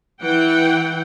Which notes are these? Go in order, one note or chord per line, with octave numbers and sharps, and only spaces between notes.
E3 F#5 G5